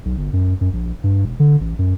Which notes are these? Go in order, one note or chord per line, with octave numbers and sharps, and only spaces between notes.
B1
G1
F#2
F#2
A#1
G2
E1
D3
A1
F#2